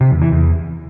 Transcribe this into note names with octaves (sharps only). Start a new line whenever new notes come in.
C3
E2
E3
E2